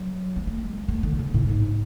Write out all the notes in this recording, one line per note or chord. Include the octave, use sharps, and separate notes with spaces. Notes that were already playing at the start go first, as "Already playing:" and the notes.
Already playing: F#3
B3
A3
G#3
A3
D3
C#3
A2
G#2